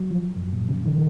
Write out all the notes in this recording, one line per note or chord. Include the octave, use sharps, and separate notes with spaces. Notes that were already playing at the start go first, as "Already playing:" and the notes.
Already playing: F#3
F3
F#2
A#2
C#3
D#3